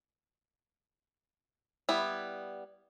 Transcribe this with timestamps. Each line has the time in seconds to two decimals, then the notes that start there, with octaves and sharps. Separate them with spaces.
1.89 G3 B3 E4